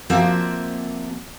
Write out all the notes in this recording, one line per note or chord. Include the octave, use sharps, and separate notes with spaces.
F3 A#3 C4 F#4 D5 E5